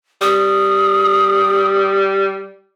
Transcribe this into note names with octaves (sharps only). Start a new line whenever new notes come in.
G3 D#6